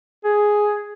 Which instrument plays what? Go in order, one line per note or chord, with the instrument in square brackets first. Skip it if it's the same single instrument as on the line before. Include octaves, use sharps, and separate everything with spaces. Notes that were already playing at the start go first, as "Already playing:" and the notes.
[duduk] G#4